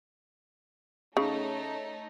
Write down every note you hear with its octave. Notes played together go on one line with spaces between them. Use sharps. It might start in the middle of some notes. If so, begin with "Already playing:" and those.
C#3 A3 D#4 C#5